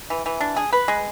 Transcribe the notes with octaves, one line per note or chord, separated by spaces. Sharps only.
E3
E3
D4
G#4
B4
G#3